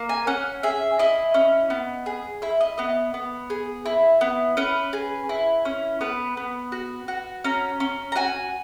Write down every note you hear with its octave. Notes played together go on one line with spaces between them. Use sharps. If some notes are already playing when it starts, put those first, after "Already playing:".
Already playing: A#3
G#5
C#4 F#5
G#4 E5
E4 D#5
C#4
B3
G#4
E4 E5
D#5
B3 D#5
B3
G#4
E4
B3
C#4 B4
G#4
E4
C#4
B3 B4
B3
F#4
F#4
C#4 A#5
C#4
A#5
F#4 G#5